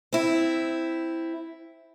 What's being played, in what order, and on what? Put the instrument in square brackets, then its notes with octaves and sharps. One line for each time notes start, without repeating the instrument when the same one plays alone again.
[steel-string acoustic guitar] C4 E4